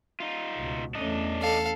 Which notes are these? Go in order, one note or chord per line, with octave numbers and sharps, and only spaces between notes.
D#4 F4
C#2 B2
E2 A3 C#4 D4 D#5
A4 F5